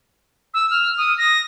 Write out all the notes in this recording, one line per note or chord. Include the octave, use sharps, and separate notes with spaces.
E6
F6
D#6
A#6